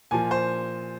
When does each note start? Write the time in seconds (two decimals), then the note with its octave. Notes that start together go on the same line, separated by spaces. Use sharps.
0.11 A#2 F3 G#5
0.31 C5